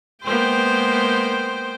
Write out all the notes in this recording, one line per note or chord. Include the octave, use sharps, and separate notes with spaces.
G#3 A#3 B3 C5 G5